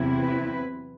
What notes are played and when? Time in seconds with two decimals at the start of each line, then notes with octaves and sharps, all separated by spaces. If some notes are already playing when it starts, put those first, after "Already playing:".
Already playing: E2 C3 F#3 C4 E4
0.20 B4